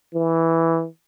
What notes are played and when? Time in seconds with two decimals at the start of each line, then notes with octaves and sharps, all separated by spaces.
0.14 E3